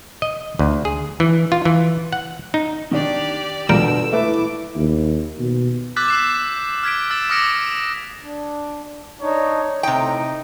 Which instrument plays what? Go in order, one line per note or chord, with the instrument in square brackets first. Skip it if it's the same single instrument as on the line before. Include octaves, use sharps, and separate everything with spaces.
[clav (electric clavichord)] D#5
D2
G#4
E3
F4
E3
F#5
D#4
[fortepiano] D#3 D4 [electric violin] G4 D5
[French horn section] B2 D3 [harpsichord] G3 A#4 G5 [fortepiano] F4 [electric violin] E6
[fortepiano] A3 A4 B4 [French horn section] E4 [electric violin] D6
[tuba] D#2
B2
[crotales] D6 E6 F#6 G6 A6 B6
E6 C7 E7
F6 G#6 B6 D7
E6 A6 B6 E7
D6 D#6 F6 A#6 C#7 D7
[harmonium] D4
[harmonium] D4 D#4 [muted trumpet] C#5
[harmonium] A2 [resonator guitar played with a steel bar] C3 G5 [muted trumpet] D#4